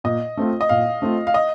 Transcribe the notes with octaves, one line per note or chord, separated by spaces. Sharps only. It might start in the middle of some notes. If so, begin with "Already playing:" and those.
A#2 D#5
A3 C4 F4
D#5
A#2 F5
A3 C4 F4
F5
D#5